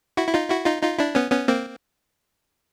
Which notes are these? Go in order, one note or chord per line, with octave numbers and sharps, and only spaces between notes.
E4 F#4
E4
D#4 F4
E4 F#4
D#4 F4
D#4 F4
D4 E4
B3 C#4
B3 C#4
A#3 C4